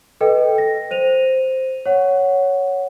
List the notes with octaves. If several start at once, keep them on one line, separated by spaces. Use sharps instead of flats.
A4 B4 D#5 G5
A#6
C5 D#7 F7
C#5 F#5